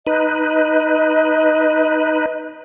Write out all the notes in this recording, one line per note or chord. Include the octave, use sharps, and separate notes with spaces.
D#4 B4 D#5